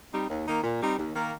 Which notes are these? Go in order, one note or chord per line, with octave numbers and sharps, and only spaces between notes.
G3 C4 D#4
D#2
D#3 A#3 D#4
A#2
G3 C4 D#4
D#2
D#3 A#3